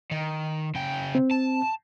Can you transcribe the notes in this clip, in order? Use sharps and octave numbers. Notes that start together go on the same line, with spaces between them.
D#3
C#3 G5
C4
A5